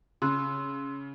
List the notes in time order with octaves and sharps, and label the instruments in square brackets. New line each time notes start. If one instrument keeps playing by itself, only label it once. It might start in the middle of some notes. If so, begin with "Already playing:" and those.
[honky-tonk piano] C#3 [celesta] C6 E6 F#6